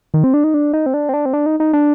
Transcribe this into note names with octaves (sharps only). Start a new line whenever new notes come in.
D#3
C4
D4
D#4
D4
D#4
C4
D4
C4
D4
C4
D4
D#4
D#4
D4